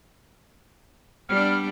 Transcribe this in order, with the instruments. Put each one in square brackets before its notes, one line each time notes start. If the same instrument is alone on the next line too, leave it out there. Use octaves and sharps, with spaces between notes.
[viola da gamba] G3 B3 D4 [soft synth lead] F6